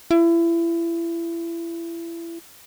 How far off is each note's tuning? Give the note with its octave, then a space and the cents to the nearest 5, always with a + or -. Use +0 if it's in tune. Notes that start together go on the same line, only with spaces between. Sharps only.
E4 +30